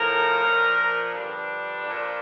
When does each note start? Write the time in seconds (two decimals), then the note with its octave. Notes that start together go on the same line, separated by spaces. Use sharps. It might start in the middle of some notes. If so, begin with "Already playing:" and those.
Already playing: A2 F3 A#4
0.43 A#2 F3
1.13 G2 D3 F3 D4
1.84 A#2 F3